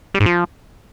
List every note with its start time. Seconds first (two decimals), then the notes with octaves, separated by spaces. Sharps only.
0.14 G3
0.20 G#2
0.26 F3